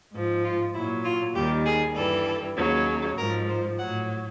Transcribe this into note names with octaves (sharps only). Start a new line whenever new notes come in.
G#2 F3
F4
A#2 F#3 E4
F4
D#2 D#3 G3 G4
G#4
G2 E3 G3 A4
D#2 C#3 F#3
G#2 F3 A#4
C5
A2 F#3 F#5